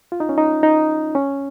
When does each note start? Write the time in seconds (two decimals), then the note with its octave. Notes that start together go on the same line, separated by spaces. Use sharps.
0.12 F4
0.20 D#4
0.29 C#4
0.38 D#4
0.63 D#4
1.15 C#4